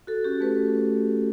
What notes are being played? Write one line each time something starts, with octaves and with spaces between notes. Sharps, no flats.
F#4 A4
C#4 G4
A3 B4